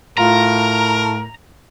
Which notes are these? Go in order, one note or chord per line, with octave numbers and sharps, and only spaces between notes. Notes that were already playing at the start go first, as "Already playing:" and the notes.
A2 F4 A#4 A#5